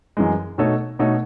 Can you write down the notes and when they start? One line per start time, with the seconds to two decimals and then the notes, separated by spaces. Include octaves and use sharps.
0.17 F#2 E3 G#3
0.58 B2 A3 D#4 A4 C#5
0.99 B2 A3 D#4 A4 C#5